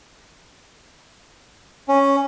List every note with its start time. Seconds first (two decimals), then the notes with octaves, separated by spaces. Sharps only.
1.88 C#4